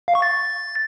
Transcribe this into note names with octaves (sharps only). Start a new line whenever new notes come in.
F5
C#6
A6